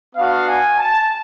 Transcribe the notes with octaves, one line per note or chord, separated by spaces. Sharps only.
B3 D4 F#4 F5
G#5
A5